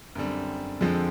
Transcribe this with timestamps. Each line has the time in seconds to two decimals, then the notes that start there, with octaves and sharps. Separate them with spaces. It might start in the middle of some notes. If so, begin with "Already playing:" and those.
0.15 F#2 D3 G3 C4
0.81 F2 D3 F3 G#3 C4